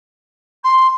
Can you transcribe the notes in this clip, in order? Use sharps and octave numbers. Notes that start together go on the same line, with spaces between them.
C6